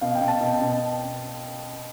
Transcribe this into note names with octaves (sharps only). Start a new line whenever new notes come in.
B2 F5
G5
B2
A5
B2
B2